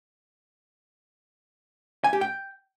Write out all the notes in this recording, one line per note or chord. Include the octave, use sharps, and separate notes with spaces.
G#5
G4
G5